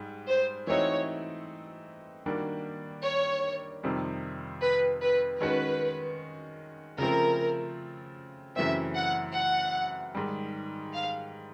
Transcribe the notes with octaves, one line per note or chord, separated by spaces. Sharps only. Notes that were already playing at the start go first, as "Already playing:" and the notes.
Already playing: G#2 G3
C5
E3 A3 C4 D#4 F#4 C#5
D#3 G3 A#3 D4 F#4
C#5
F2 C3 D#3 G3 C4
B4
B4
D#3 G#3 C#4 F#4 B4
C#3 F3 A3 C4 A#4
F#2 C#3 E3 A3 C4 E5
F#5
F#5
G#2 D#3 G3
F5